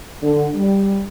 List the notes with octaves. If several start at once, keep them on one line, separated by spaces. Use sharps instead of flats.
D3
G3